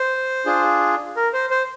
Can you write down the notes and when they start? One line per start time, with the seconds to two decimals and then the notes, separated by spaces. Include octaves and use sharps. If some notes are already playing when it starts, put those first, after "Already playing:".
Already playing: C5
0.46 D4 F4 G#4
1.16 A#4
1.33 C5
1.50 C5